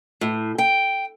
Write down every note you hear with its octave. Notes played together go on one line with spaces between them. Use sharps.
A2
G5